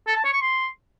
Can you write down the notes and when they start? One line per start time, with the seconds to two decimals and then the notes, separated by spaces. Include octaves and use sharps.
0.07 A4
0.16 A5
0.24 C#5
0.33 C#6
0.41 C6